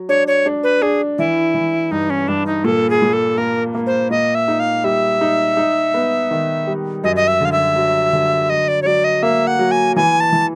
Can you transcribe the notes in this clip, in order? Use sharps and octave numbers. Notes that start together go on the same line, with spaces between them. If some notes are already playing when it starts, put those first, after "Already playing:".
Already playing: F#3
D4 C#5
C#5
D4
B4
D4 G#4
E3 E4
E3
G2 D#4
C#4
G2 D4
D#4
A#2 A4
G#4
A#2
A4
A#3 A#4
A#3
C5
A#2 D#5
E5
D#4
F5
G3 E5
D#4
D#4
B3
D#3
G3
F#2 D#5
D#5
E5
D3 F5
E5
F#3
D3
F#3 D#5
D5
C#5
F#3 D5
D#5
A#3 E5
F#5
F#3
G#5
E3 G#5
A5
E3